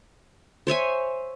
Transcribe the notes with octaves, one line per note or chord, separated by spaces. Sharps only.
C5 C#5 E5 G#5